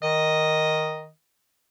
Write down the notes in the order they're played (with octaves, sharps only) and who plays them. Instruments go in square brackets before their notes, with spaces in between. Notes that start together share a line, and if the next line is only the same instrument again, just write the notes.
[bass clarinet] D#3 [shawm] D#5